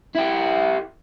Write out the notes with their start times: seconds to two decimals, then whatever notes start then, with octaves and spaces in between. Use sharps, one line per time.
0.15 E4 G4